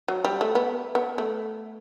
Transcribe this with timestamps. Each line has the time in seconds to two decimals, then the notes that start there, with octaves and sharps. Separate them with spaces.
0.08 F#3
0.25 G3
0.41 A3
0.55 B3
0.95 B3
1.18 A3